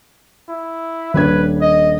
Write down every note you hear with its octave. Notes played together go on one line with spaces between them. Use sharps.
E4
D#1 D4 B4 G#6
D#5